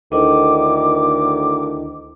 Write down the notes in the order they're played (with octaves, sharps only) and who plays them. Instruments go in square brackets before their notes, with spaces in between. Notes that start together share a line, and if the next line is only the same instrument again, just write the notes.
[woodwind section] D2 D#3 [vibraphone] D4 E4 D#5 [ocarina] D6